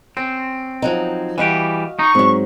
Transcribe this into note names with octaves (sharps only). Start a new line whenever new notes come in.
C4 C#4
F3 F#3 D#4
E3 G3 F#4 G4 D#5 F5
D#4 C#6
G#2 F#3 C4